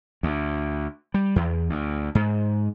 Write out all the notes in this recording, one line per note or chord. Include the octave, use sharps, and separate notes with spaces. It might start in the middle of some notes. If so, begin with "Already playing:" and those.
D2
G3
E2
D2
G#2